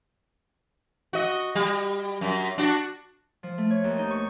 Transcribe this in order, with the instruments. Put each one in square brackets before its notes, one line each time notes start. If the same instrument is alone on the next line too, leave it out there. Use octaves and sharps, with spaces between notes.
[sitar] F#4 D#5
G3
F#2
D4 F#4
[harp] F3
A3
C#5
D#2
D#4
C#6